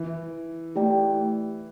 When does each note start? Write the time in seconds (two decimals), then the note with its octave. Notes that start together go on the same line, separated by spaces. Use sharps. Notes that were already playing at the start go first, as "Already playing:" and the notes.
Already playing: E3
0.76 A3 E4 G4 D5 G5